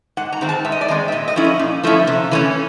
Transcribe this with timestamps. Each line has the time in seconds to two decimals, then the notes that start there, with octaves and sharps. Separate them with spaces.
0.17 G#2 F#5
0.32 A#5
0.41 D#3 G#3 C4
0.49 A5
0.65 G#2 E5
0.72 D#5
0.81 D5
0.88 D#3 G#3 C4 D#5
1.08 E5
1.12 A#2 D#5
1.28 D#5
1.36 F3 A3 C#4 E4
1.44 D#5
1.59 A#2
1.84 F3 A3 C#4 E4
2.07 C3
2.31 E3 A3 C#4